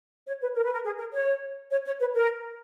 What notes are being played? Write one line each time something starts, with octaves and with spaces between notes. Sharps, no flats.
C#5
B4
A#4
B4
A#4
G#4
A#4
C#5
C#5
C#5
B4
A#4